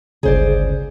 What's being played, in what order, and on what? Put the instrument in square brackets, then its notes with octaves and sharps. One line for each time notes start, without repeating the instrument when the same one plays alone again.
[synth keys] G1 C#2 C#3 [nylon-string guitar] G#4 C5 D5